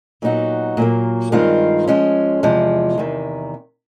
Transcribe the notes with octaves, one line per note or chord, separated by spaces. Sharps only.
A#2 F#3 B3 D#4 F#4
A#2 F#3 A#3
G2 D#3 G#3 C4 F4
F3 G#3 C#4
E2 C3 F3 G#3
E2 C3 D#3